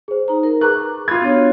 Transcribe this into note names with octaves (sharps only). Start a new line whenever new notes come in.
G#4 C5
D#4 C5 A#5
A#4
G#4 B4 A#5 C#6 D6 F#6
F4 B5 G#6
B3 D4 F#4 C#5